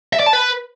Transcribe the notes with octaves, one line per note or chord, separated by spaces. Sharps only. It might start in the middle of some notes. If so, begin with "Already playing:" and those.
E5
D5
A5
B4